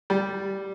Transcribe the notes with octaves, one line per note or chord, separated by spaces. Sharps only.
G3